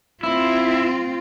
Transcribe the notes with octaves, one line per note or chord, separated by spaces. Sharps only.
C4 E4 F4